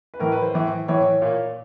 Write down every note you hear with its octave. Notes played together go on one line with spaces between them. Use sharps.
B4
A2 E3 A#4
B4
C5
A2 E3
A2 E3 C#5
A#2